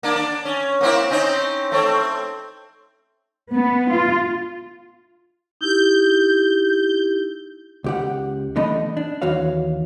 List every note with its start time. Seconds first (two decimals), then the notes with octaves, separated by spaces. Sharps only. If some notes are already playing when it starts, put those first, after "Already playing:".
0.03 A#3 D4
0.16 D4
0.45 C#4
0.81 A#3 C4 E4
1.11 C4 C#4 D#4
1.72 A3 C4 C#5
3.52 B3
3.93 F4
5.61 D#4 E4 G4 G6
7.84 C#2 G4 F#5
8.56 D3 E3 A3 D#5 B5
8.97 D4
9.22 D#2 E3 F#4 C#5 F5